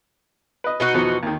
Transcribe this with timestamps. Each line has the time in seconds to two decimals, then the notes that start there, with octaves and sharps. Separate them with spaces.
0.64 B4 D#5
0.80 B2 D#4 F#4
0.94 E2 F3 B3
1.23 D#2 D#3